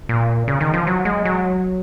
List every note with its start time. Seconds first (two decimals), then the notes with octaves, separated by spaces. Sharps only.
0.09 A#2
0.48 C#3
0.60 D#3
0.74 F3
0.87 F#3
1.05 G#3
1.25 F#3